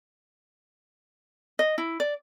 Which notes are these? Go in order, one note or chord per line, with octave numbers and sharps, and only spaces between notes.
D#5
E4
D5